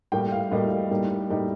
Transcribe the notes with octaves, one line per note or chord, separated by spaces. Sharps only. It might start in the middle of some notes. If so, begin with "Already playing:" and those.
A2 G3 A#3 G5
F5
A2 G3 A#3 D#5
A2 G3 A#3 D#4
A2 G3 A#3 D#4